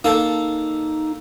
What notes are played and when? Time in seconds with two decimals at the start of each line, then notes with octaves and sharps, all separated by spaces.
0.04 A#3 D#4 A4